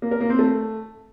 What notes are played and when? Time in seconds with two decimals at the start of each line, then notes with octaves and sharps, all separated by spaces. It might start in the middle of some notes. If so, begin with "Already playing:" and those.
0.02 A#3
0.11 A#4
0.21 A#3
0.30 C4
0.39 A3